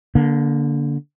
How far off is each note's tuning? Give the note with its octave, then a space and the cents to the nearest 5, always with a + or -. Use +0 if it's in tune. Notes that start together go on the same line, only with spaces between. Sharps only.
D3 -15 A#3 +20